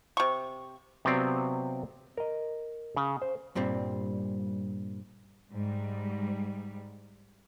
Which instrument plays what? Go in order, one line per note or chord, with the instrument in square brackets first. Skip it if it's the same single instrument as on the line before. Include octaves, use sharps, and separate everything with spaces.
[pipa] C3 C#6
[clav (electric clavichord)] C3 F#3 B3 C4 D5 F5
A#4 D#5
C#3
C5
[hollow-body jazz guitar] G2 A#2 G3 C4
[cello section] G#2 G3